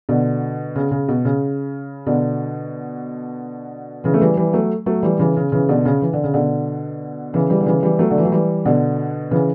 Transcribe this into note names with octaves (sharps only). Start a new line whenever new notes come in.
B2 D3
C#3
C#3
B2
C#3
B2 D3
C#3 E3
A3
E3 G3
E3 G3
F#3 A3
F#3 A3
E3 G3
C#3 E3
C#3
C#3 E3
B2 D3
C#3
E3
D3
C#3
B2 D3
C#3 E3
E3 G3
D3
C#3 E3
E3 G3
F#3 A3
D3
E3
F#3
E3 G3
B2 D3
C#3 E3